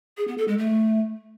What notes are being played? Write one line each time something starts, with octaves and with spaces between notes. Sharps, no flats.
G#4
B3
A4
G#3
A3